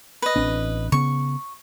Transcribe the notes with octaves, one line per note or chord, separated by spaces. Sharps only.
B4 D#5
A1 C4 D4
C#3 B3 C#6